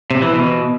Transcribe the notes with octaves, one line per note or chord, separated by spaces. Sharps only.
C3
E3
B2